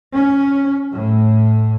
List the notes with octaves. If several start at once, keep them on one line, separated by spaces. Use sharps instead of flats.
C#4
A2